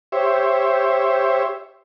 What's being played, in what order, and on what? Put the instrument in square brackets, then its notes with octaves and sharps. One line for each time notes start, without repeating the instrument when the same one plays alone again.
[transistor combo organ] G4 C5 C#5 E5